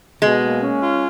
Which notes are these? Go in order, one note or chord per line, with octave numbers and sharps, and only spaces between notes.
B2 G#3
A#3
C#4
F4